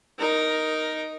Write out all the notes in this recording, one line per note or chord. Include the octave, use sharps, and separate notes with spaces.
D#4 A#4